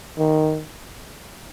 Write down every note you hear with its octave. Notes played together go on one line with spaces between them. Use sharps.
D#3